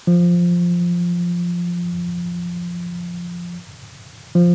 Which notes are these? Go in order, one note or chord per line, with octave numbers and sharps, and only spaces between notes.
F3
F3